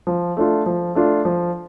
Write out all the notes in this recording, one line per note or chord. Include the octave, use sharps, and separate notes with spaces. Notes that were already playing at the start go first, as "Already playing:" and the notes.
F3
A3 D4 F4
F3
A3 D4 F4
F3